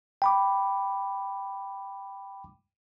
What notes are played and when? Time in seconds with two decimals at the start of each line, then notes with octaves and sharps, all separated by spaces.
0.22 G5 B5 D6